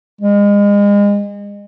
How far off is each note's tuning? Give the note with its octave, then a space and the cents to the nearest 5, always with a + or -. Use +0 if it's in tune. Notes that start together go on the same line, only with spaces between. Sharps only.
G#3 -35